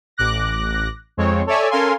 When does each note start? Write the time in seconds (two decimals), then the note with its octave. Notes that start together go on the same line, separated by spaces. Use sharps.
0.17 A1 D6 F#6 A#6
1.17 F2 G#3 C4 C#5
1.46 A4 C#5 D5 E5 G#5
1.70 C#4 A4 A#4 F5 G#5 C6